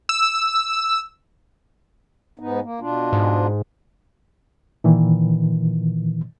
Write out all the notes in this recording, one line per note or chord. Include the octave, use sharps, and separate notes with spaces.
E6
G#2 B3 D#4
A#3
B2 D4 F4
G#2
A#2 D#3 E3